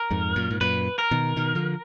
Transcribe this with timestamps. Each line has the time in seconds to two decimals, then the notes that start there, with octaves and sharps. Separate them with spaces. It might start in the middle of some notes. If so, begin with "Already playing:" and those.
Already playing: A#4
0.11 F2 G#2
0.36 F#2 A#2
0.51 G#2
0.61 F#2 A#2 B4
0.99 A#4
1.11 B2 D#3
1.36 B2 D#3
1.55 D3 F3